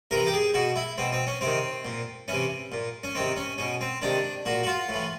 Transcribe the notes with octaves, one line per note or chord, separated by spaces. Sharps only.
C3 E3 A#4
G4
G#4
B2 F#4
E4
B2 C4
C4
C#4
C3 D#3 C4
A#2
C3 E3 C#4
A#2
C#4
C3 D#3 C4
C#4
B2 C#4
C4
C3 D#3 D4
A#2 F#4
F#4
F4
A2
E3